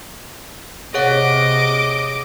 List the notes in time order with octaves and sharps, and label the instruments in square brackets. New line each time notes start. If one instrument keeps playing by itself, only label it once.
[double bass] C3 [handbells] G#4 C#5 F#5 [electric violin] D#5 D6